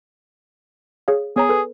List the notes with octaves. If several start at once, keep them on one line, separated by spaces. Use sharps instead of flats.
G#4 C#5 F5
B3 G#4 C#5 A#5
A4 B4